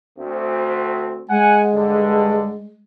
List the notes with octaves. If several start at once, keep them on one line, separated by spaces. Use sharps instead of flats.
D2 A3 C4
G#3 F#5 G#5
G2 D3